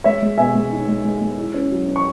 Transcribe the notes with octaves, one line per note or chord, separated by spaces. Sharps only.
G#3 C#5 E5
G#3
B2 E5 G#5
G#3
D#4
G#3
G#3
G#3
E4
C#4
F#3
C#4
C#6